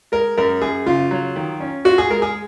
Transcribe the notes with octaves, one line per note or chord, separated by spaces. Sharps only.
G#3 A#4
F#2 A#4
F#2 G#4
C#3 F4
F#3
D#3
C#4
F4 F#4
G#4
G#3 A#4
G#4